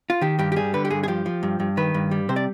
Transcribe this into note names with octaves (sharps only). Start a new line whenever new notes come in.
F4
D#3 G4
G2 G4
G4
G3 G#4
D3 B4
G4
G2 G#4
G#4
F3 G4
F3
G2
G2
D#3 B4
G2
G3
C3 C5
D5